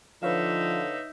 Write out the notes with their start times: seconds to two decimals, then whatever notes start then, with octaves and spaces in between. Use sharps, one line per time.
0.23 D3 F3 D#4 B4 C#5 E5 F5